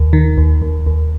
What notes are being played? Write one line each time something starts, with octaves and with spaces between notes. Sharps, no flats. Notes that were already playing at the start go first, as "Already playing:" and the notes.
Already playing: D#2
D#3
D#2
D#2
D#2